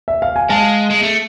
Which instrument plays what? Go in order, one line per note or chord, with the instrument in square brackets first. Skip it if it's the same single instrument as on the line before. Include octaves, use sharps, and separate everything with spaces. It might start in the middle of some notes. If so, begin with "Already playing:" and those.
[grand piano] E5
F5
G#5
[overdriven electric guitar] G#3 [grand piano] F5 A5
[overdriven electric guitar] G#3
A3